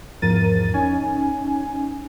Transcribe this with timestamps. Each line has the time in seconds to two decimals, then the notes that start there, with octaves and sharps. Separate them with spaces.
0.22 E2 G#2 F3 A#4 A6 D#7
0.74 C#4 D#4 G#5